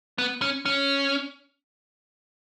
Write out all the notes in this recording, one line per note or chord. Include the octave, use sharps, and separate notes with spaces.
B3
C#4
C#4